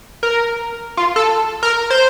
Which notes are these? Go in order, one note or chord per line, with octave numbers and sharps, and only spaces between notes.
A#4
F4
A4
A#4
C5